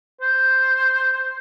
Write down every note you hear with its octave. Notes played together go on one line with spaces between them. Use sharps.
C5